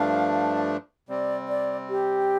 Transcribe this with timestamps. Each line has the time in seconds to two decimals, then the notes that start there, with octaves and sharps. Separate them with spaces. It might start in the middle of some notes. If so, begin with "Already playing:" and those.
Already playing: G2 F3 A3 D4 F5
1.09 C3 G3 C4 D5
1.49 D5
1.89 G4